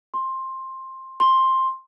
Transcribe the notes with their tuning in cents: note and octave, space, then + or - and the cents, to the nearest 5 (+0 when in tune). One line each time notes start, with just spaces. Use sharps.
C6 +15
C6 +10